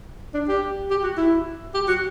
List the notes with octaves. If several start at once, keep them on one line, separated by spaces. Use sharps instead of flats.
D4
G4
G4
F#4
E4
G4
F#4